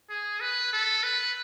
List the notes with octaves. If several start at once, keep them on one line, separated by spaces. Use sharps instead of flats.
G#4
B4
A4
B4